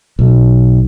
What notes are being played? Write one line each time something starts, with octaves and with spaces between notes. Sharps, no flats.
B1